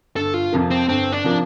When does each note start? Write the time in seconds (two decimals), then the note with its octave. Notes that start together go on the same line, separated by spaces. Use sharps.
0.16 G1 A4
0.34 F4
0.52 F2 C3 F3 A#3
0.71 C4
0.88 G1 C4
1.12 D4
1.24 C3 F3 A#3